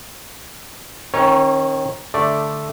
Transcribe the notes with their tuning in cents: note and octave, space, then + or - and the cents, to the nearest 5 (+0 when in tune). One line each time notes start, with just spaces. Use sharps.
D#3 +0 C#4 -40 C#5 +0
D3 +0 A3 +0 D5 +0